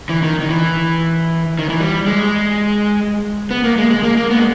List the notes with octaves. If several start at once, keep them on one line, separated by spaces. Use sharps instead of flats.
E3
D#3
D#3
E3
D#3
E3
G3
G#3
B3
A#3
G#3
G#3
A#3
A#3
B3
G#3